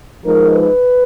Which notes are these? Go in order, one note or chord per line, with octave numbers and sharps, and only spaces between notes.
F3 G#3 D#4 A#4
B4